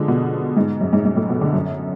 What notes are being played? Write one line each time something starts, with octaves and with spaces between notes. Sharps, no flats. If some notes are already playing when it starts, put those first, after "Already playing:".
Already playing: D3 F3 G#3
B2
G#2
F#2
G#2
G#2
A2
B2
D3
F#2